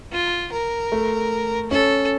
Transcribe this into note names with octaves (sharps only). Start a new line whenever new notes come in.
F4
A#4
A3
C#4 A4